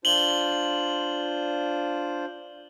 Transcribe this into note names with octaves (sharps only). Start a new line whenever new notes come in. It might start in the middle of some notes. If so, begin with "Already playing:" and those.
D4 F4 C5 F#7 G7